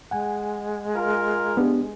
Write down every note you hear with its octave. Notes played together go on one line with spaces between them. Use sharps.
G#3 F#5 G#5
F4 A#4
B3 D4 G4